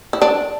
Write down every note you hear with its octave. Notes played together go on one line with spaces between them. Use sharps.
E4
D4